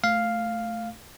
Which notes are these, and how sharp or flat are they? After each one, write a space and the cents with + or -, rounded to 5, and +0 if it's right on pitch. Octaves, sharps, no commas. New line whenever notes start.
A3 -5 F5 +0